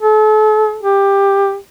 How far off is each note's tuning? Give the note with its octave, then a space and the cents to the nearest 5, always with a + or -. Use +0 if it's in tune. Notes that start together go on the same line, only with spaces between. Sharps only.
A4 -40
G4 +15